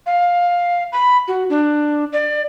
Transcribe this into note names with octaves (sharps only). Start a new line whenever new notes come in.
F5
B5
F#4
D4
D5